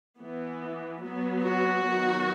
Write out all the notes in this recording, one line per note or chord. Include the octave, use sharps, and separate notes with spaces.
E3 B3
F#3 B3
F#4
D#3 F#3 B3